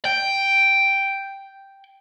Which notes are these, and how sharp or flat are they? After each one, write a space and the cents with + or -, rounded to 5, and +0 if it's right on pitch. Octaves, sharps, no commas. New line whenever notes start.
G5 +0